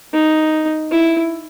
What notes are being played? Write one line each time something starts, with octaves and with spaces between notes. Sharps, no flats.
D#4
E4